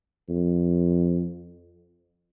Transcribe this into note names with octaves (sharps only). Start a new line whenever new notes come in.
F2